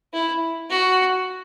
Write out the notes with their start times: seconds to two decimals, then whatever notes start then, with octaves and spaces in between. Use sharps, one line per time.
0.13 E4
0.70 F#4